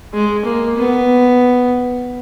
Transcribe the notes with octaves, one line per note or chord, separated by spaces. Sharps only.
G#3
A#3
B3